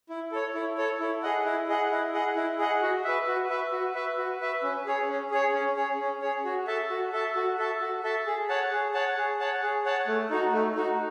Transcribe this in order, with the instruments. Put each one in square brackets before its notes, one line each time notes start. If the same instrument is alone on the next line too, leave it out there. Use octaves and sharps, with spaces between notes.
[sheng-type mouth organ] E4
A4 C#5
E4
A4 C#5
E4
G#4 D#5 F#5
E4
G#4 D#5 F#5
E4
G#4 D#5 F#5
E4
G#4 D#5 F#5
F#4
B4 E5
F#4
B4 E5
F#4
B4 E5
F#4
B4 E5
C#4
G#4 C#5
C#4
G#4 C#5
C#4
G#4 C#5
C#4
G#4 C#5
F#4
A4 E5 A5
F#4
A4 E5 A5
F#4
A4 E5 A5
F#4
A4 E5 A5
G#4
C#5 F#5 A5
G#4
C#5 F#5 A5
G#4
C#5 F#5 A5
G#4
C#5 F#5 A5
A3
D#4 F#4
A3
D#4 F#4